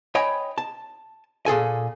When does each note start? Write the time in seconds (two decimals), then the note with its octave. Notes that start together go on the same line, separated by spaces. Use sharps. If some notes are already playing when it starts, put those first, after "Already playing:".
0.15 C#5 D#5 G5 G#5 B5
0.58 A5
1.46 A#2 G#4 A4 G#5